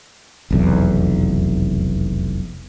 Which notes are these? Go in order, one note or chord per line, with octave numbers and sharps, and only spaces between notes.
F1 B1 E2